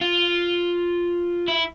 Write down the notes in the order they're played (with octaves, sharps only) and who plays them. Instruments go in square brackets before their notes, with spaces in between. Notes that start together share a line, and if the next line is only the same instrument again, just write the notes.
[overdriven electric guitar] F4
E4